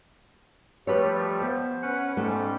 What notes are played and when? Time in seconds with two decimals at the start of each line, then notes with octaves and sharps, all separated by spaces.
0.87 F3 G3 A3 G4 B4 C#5
1.42 B3 C5
1.83 C#4 B4 F#5
2.17 G#2 G3 A3 C#4